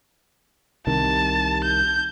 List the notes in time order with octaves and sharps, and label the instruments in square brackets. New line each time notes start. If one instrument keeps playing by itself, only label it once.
[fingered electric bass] C2 C3 D#3 [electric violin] A5
[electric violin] G6